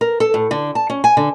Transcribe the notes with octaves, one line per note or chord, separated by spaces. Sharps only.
A#4
A4
A2
D3
A5
C#4
G#5
D3